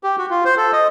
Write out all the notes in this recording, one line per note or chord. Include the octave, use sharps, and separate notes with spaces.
G4
F#4
F4
C5
A4
D#5